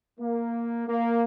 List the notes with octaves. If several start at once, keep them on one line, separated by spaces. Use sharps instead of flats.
A#3
A#3